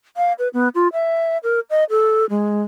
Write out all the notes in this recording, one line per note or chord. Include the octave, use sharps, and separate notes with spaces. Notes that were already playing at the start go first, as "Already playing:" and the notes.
F5
B4
B3
F4
E5
A#4
D#5
A4
G#3